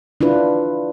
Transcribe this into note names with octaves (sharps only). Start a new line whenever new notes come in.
D4 E4 F4 B4